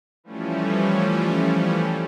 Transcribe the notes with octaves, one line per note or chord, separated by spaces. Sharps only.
E3 F3 G3 A3 C#4